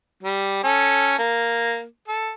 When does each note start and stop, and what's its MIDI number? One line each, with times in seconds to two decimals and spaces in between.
0.23 0.59 55
0.64 1.18 61
0.64 1.18 69
1.19 1.84 58
2.08 2.32 69